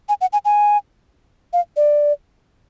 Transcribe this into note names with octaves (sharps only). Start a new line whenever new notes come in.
G#5
F#5
G#5
G#5
F5
D5